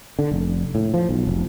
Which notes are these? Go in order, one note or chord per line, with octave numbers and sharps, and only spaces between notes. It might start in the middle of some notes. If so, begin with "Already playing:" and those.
D3
F1
A2
F3
B1
F1